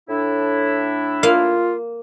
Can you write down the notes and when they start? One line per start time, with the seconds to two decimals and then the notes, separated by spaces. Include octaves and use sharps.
0.09 A2 D4 E4
1.23 A#3 F4 F5